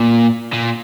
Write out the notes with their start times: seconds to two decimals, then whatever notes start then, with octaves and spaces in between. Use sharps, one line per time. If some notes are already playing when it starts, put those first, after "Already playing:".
Already playing: A#2
0.53 A#2